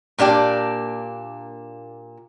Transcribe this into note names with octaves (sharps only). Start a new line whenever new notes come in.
A#2 A#3 D4 G4